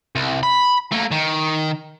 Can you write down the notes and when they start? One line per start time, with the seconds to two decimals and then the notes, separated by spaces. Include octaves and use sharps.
0.15 C2
0.43 B5
0.92 A3 A#3
1.12 D#3